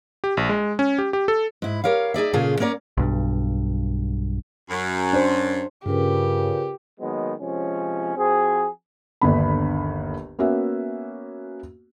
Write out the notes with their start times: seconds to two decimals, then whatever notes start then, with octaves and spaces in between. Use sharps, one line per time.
0.24 G4
0.37 A#1
0.49 G#3
0.79 C#4
0.99 G4
1.13 G4
1.28 A4
1.62 G#2 E4
1.84 G4 A#4 C#5 F5
2.14 D#4 G#4 D5 E5
2.33 A#2 C#3 F4 G#4 A4
2.60 A#3 C#4 A#4 D5
2.97 B1 G2
4.70 F#2
5.13 D4 C5
5.86 G2 C#3 F4 G4 A#4 B4
7.00 D#3 F#3 G#3 A#3 B3
7.39 C3 F3 G#3 C#4
8.17 F3 C4 F#4 G#4
9.21 G1 D#2 D3 B3 B5
10.39 A#3 B3 C#4 F#4 E5